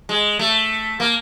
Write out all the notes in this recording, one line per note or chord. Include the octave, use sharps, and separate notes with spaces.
G#3
A3
A#3